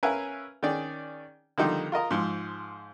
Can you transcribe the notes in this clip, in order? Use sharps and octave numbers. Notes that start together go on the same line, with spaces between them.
C#4 A#4 B4 E5 F5 G#5
D#3 C#4 G#4 D5
D3 D#3 F3 G3 D#4 A4
F4 A#4 D#5 A#5
G#2 F3